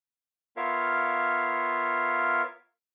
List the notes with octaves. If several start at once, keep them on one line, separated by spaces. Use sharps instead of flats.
B3 F4 A#4 C#5 E5 F5